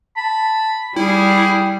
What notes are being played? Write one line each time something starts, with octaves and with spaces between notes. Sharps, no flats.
A5 B5
G3 E4 G#4 G5